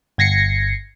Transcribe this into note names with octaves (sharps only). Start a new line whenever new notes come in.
G1 G#6 A#6 C7 C#7